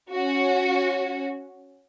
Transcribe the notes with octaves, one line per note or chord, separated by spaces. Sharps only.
C#4 F#4